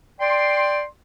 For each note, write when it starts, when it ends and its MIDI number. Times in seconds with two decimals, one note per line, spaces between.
0.20 0.83 74
0.20 0.83 79
0.20 0.83 84